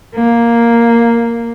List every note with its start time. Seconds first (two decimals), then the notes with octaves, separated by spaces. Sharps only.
0.13 A#3